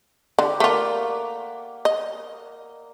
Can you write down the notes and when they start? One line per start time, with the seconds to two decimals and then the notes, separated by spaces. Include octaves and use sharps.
0.39 D3 G4
0.60 A3 A#3 F4 D5 F#5
1.85 D#5